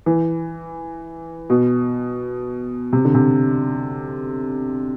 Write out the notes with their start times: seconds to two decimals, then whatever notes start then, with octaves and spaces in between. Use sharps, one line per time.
0.06 E3
1.50 B2
2.93 C3
3.05 D3
3.14 C3